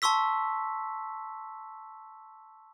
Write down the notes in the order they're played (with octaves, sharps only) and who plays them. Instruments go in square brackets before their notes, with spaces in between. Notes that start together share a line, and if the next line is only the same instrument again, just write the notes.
[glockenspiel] A5 C6 C#6 E6 B6